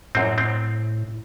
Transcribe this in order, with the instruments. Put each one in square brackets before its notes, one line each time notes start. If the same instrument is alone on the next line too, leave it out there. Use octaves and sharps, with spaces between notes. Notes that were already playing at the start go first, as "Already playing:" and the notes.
[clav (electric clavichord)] F#2 C4 [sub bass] A2
[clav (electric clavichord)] C4